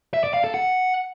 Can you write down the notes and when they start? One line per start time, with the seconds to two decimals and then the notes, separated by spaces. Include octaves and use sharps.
0.14 E5
0.24 D5
0.34 F5
0.44 A4
0.54 F#5